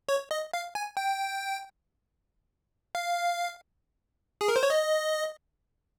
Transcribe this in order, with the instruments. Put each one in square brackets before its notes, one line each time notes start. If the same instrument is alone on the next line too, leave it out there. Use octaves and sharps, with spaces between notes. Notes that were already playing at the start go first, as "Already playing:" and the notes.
[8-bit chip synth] C#5
D#5
F5
G#5
G5
F5
G#4
A#4
C5
C#5
D#5